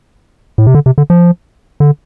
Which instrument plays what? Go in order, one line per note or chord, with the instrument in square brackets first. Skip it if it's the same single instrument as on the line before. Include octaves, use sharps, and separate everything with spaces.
[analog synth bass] A2
C3
D3
C3
D3
F3
D3